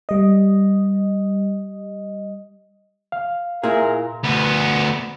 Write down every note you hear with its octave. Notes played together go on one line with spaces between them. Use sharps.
G3 D#5
F5
A#2 E4 G#4 A#4
D2 B3